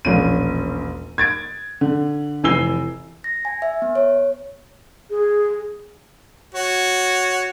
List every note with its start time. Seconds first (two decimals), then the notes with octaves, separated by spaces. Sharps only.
0.05 E1 A#1 C#4 D#7
1.18 G#6 A6 D7
1.81 D3
2.44 F1 E3 G#5 E6 C7 G7
3.24 A#6
3.45 G#5
3.62 E5
3.82 B3
3.95 C#5
5.10 G#4
6.54 F#4 C#5